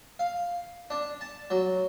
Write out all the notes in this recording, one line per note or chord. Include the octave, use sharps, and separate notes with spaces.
F5
D4
A5
F#3